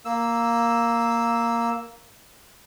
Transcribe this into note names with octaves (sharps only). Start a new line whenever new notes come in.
A#3 E6